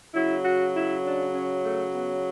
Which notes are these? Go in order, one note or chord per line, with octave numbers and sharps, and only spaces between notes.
C#3 F#3 E4
F#4
E4
D4
C#4
A3
B3